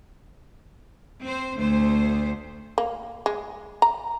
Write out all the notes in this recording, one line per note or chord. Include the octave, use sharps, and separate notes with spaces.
C4 C5
D2 A3 C5
A#3
G#3
A#5